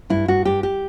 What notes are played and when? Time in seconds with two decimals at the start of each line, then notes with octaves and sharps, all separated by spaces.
0.10 G2 E4
0.28 G2 F#4
0.45 G2 G4
0.63 G4